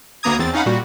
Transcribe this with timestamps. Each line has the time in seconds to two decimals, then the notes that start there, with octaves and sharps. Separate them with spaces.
0.23 D2 A#3 B3 A#5 D#6 G#6
0.39 E2 C4 A6
0.53 C#4 D#4 F5 F#5 B5
0.66 A#2 G3 F#4